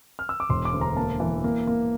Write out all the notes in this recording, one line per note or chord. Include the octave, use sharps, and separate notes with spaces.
F6
E6
D6
E1 C6
D6
D2
A#5
A#3 A5
E3
A#3
A#3